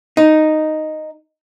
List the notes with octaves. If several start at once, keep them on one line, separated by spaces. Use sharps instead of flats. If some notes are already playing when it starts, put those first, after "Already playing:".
D#4